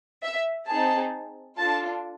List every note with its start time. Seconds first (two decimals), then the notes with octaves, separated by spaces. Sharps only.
0.23 E5
0.68 C4 D#4 G#4 A5
1.58 D4 F4 A4 A5